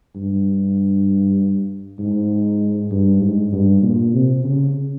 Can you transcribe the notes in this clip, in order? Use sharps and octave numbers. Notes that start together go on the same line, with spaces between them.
G2
G#2
G2
G#2
G2
A#2
C3
C#3